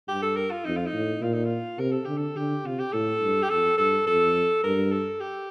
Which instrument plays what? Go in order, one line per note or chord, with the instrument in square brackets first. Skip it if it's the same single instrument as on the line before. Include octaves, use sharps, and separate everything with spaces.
[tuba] G2 [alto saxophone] G4
[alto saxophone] A4
A#4
F4
[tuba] F2 [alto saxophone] D#4
[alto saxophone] F4
D#4
[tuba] A2
[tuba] A#2 [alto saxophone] F4
[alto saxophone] D#4
F4
[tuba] C3 [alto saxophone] A#4
[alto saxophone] A4
[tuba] D3 [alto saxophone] G4
[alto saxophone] A4
[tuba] D3 [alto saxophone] G4
[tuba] C3 [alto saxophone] F4
[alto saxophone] G4
[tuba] A2 [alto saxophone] A4
[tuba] G2
[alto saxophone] G4
[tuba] F2 [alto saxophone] A4
[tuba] G2 [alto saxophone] A4
[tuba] F2 [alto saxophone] A4
[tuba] G2 [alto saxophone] A#4
[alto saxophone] A4
G4